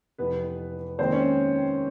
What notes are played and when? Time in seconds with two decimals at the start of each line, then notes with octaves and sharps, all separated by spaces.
0.18 F1 F2 C3 E3 B3 B4
0.99 D#2 D#3 G#3 C4 C5
1.12 C#4 C#5